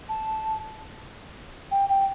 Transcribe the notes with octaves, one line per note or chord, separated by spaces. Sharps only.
A5
G5
G5